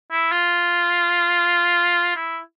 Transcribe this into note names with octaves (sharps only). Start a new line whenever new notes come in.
E4
F4
E4